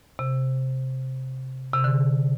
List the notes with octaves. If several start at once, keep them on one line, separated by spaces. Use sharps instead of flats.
C3
C3
D3